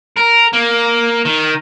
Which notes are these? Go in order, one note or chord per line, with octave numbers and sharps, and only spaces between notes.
A#4
A#3
D#3